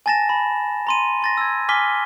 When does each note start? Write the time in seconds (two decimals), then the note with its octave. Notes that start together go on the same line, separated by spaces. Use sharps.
0.06 G#5 A5 A6 A#6 E7
0.29 B5
0.87 A#5 C6 D#7
1.22 C6 A6 A#6
1.37 E6 G#6
1.69 G#5 D6 F6 B6 G7